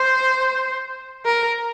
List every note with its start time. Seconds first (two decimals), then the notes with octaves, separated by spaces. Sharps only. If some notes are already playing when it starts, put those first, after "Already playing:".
Already playing: C5
1.25 A#4